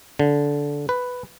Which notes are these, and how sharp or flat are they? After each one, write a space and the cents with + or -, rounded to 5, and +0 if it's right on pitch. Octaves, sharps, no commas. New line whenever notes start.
D3 -15
B4 +5